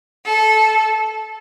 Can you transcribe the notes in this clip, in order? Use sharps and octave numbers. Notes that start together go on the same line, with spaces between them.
A4